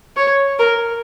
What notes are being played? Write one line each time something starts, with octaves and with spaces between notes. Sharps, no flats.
C#5
A#4